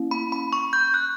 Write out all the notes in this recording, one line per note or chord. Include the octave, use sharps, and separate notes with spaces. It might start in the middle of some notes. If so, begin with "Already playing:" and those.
Already playing: A#3 C#4 E4
B5
B5
C#6
G6
F#6